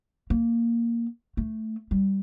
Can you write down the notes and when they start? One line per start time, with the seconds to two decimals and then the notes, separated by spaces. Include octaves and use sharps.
0.30 A#3
1.37 A3
1.91 G3